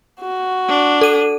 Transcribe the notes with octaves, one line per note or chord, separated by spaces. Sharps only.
F#4
D4
A4 D#7